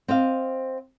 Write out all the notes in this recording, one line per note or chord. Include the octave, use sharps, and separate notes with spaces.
C4 D#5 F5